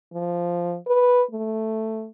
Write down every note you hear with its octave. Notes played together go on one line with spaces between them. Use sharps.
F3
B4
A3